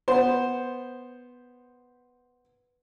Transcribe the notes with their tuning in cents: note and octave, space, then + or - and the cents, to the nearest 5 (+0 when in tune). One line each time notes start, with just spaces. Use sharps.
B3 +0 C5 +0